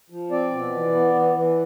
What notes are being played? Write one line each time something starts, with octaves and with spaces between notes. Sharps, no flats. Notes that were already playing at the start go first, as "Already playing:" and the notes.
F3
C4 D5
B2
E3
B3
E3
E3